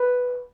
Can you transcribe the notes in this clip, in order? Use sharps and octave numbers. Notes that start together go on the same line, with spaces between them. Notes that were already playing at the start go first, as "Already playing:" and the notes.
Already playing: B4